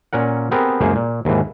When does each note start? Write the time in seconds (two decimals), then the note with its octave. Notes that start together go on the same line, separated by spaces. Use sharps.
0.13 A#2 C#4 A#4 F#5
0.51 B3 C4 G4 G#4 A#4
0.81 C#2 F#2 A#3 G#4 C5
0.95 A#2
1.25 D#2 G#2 E3